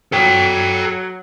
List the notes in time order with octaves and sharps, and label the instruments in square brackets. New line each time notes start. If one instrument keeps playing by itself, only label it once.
[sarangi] F#3 [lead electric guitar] A4 G5